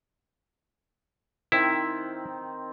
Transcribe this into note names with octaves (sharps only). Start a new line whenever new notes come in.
D#3 C4 E4